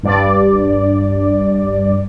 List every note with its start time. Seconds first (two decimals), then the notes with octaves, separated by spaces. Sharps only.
0.03 G2 D5